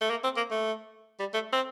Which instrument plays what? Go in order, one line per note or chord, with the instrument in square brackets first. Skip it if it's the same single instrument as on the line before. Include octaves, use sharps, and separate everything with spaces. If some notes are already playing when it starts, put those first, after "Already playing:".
[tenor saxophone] A3
A#3
C4
A#3
A3
G3
A3
C4